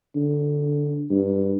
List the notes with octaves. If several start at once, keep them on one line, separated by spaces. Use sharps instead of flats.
D3
G2